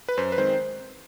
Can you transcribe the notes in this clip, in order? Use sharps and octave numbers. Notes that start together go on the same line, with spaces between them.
B4
F#2 C5
B4
D#3 G#3 C4 C5